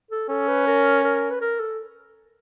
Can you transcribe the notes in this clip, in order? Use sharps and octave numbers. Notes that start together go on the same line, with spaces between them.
A4
C#4 A4
B4
A#4
A#4
B4
A#4
A4